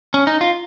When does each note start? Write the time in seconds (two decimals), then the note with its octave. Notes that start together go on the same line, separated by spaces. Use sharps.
0.14 C#4
0.27 D#4
0.41 F4